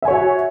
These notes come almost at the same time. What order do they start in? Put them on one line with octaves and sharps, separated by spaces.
E5 G#5 C#5 F#4